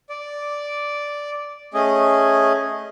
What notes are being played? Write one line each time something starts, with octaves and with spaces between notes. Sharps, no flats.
D5
A3 C#4 G#4 D#5